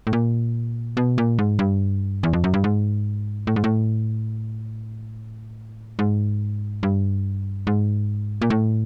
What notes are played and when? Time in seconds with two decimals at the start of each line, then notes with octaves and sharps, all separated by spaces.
0.07 A2
0.13 A#2
0.97 B2
1.18 A#2
1.38 G#2
1.59 G2
2.23 E2
2.33 F2
2.44 F#2
2.54 G2
2.64 G#2
3.47 A2
3.56 G#2
3.64 A2
5.99 G#2
6.83 G2
7.67 G#2
8.42 A#2
8.50 A2